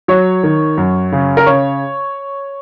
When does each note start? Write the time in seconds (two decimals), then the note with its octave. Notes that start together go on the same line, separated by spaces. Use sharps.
0.08 F#3 C#5
0.43 D#3
0.77 F#2
1.12 C#3
1.37 A#4
1.46 C#3 C#5